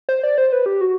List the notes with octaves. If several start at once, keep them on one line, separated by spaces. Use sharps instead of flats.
C5
D5
C5
B4
G4
F#4